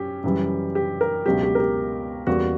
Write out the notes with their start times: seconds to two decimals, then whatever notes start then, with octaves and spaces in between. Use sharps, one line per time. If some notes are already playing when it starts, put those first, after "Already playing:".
Already playing: F#2 C#4 G4
0.24 F#2 C#3 E3 G3
0.75 G4
1.01 A#4
1.26 C#2 B2 F#3 G4
1.43 G4
1.55 A#4
1.60 G4
2.27 E2 C#3 G3 A#3 F#4